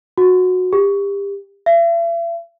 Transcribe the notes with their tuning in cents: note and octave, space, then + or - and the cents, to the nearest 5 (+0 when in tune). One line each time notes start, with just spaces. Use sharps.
F#4 -15
G4 +30
E5 +45